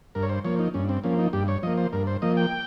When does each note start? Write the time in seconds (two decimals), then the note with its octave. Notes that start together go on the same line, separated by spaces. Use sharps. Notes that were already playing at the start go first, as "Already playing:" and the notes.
0.15 G2 A#4
0.23 C#5
0.29 C5
0.44 F3 A#3 C#5
0.59 D#4
0.74 G2 C#4
0.89 C4
1.03 F3 A#3 C#4
1.19 D#4
1.33 G2 G4
1.48 C#5
1.63 F3 A#3 D#5
1.77 C5
1.93 G2 A#4
2.07 C5
2.22 F3 A#3 D#5
2.37 G5